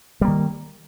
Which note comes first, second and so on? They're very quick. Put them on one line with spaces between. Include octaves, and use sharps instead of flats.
G3 A#3 D#3